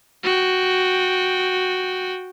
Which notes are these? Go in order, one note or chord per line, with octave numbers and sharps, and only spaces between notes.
F#4 G5